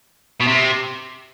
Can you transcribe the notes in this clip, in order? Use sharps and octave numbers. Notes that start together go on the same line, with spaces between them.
B2
C3